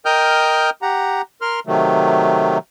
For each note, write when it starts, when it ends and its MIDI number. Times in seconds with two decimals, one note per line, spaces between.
0.05 0.70 70
0.05 0.70 75
0.05 0.70 79
0.05 0.70 87
0.05 0.70 89
0.05 0.70 91
0.82 1.22 67
0.82 1.22 78
0.82 1.22 82
1.42 1.60 70
1.42 1.60 84
1.42 1.60 89
1.67 2.58 48
1.67 2.58 51
1.67 2.58 54
1.67 2.58 57